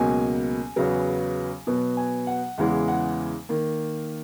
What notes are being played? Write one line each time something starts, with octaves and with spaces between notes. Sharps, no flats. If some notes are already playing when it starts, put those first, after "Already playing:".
Already playing: C#2 B2 F#3 A#3 G#5
E2 C#3 F#3 B3
B2 F#3 B3
G#5
F#5
E2 C#3 E3 G#3 F#5
F#5
D#3 A#3